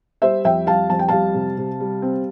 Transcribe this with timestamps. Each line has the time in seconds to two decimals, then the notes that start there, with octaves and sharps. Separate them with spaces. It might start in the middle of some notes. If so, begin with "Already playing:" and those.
0.22 G3 C5 E5
0.45 F2 E5 G5
0.67 G3 F5 A5
0.90 F2 A5
0.99 G5
1.08 G3 F5 A5
1.34 C3
1.57 C3
1.80 G3
2.02 C4